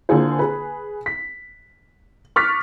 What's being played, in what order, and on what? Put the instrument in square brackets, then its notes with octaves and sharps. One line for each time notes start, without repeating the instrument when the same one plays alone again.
[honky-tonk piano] D3 A#3 F4 G#4 C5
G#4 B4
B6
C#6 D6 F6 F#6 A6 B6